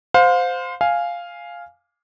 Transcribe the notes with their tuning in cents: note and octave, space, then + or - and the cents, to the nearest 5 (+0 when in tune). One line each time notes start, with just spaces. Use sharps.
C5 -15 F5 +30
F5 +0 G#5 +0